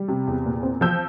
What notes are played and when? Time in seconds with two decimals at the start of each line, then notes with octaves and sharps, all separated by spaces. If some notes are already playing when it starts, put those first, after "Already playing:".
Already playing: G3
0.08 C3
0.27 E2
0.46 A#2
0.63 C4
0.81 F3 E6 G6